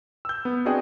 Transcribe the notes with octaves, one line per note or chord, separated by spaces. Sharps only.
E6 G6
B3
C4 D4 F#4 G#4 D#5 G5